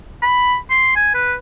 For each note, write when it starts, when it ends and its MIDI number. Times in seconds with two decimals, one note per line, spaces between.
0.22 0.56 83
0.70 0.92 84
0.96 1.12 80
1.14 1.35 71